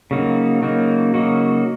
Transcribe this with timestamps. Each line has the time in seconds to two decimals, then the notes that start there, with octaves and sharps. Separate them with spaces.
0.11 C#3 F#3 A#3 D#4 F#4
0.62 C#3 F#3 A#3 D#4 F#4
1.14 C#3 F#3 A#3 D#4 F#4